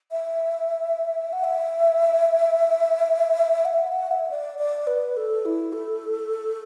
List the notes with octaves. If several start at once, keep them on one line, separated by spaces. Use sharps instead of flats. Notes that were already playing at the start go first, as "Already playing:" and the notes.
E5
F#5
E5
F#5
E5
F#5
E5
D5
D5
B4
A4
E4
A4